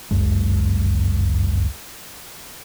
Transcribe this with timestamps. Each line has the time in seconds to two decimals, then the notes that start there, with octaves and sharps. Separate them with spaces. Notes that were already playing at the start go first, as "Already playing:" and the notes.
0.11 G1 C#2 F#2 G#3